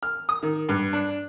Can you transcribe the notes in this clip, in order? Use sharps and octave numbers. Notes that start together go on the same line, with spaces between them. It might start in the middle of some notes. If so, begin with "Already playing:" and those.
F6
D#6
D#3
G2
D4